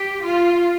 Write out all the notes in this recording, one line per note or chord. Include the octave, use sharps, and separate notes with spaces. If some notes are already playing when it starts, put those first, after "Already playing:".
Already playing: G4
F4